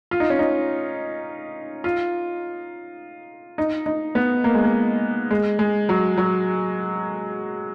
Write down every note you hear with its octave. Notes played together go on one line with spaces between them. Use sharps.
F4
D#4
C#4
D#4
F4
D#4
D#4
B3
A#3
G#3
A#3
G#3
G#3
F#3
F#3